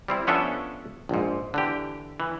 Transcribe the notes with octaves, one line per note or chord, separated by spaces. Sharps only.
G3 C4 E4
F3 B3 C#4 D4 A4 E5
A#1 G#2
D3 E3 G4
E3